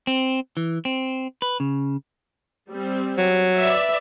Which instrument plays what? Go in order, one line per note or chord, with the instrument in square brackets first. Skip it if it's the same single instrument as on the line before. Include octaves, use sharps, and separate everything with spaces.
[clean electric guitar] C4
E3
C4
B4
C#3
[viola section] G3 C4
[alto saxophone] F#3
[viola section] B4 D5 E5